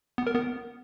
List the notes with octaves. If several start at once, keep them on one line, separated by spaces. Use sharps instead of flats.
B3
A#4
B3